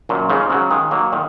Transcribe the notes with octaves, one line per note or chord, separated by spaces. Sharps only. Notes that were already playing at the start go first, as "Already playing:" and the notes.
F#2 A#2
G#2 C#3
C#3 F#3
D#3 G#3
F#3 A#3
A#2 D#3